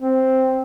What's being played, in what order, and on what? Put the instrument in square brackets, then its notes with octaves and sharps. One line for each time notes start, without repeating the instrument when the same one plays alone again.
[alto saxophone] C4